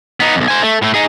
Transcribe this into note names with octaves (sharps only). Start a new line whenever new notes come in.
B3 D#4
B1 F2
C5 G#5
A3
A2 A3
D#4 G#4